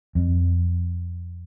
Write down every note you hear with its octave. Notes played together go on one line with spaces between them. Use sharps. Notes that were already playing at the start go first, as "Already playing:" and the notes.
F2